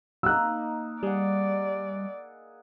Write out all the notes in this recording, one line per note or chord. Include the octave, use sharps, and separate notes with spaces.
A#3 D#4 E6 F#6
G3 G#4 D5 F#5